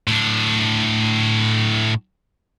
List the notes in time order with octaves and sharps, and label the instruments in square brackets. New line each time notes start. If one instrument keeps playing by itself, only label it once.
[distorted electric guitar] A2 D4